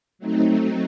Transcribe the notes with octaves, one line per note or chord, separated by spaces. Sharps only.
F#3 A3 C4 D#4